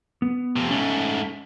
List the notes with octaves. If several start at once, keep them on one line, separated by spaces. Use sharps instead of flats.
B3
F2 C3
G#2 A3 C#4 G#5